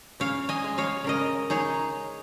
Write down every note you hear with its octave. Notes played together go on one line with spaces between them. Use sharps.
C#3 C#5 F5
D#5 G#5
G#3
C#5 F5
C#3 A#4 D#5
D#4 G#4 C#5